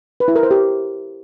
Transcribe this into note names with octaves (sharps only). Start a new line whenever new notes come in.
B4
E4
A#4
C5
G4